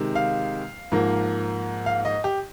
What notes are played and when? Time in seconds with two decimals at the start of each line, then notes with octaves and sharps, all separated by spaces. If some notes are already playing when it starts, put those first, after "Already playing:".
Already playing: C3 D#3 G#3
0.15 F5
0.92 G#2 F3 A#3
1.86 F5
2.05 D#5
2.24 G4